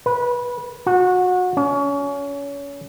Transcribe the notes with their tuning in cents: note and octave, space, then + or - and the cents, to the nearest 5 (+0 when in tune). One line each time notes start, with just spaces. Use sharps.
B4 -20
F#4 -25
C#4 +30